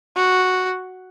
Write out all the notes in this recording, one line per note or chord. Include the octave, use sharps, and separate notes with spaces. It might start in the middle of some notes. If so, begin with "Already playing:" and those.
F#4